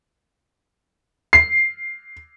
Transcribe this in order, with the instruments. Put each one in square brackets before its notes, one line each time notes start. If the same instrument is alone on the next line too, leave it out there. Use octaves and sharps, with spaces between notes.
[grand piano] C7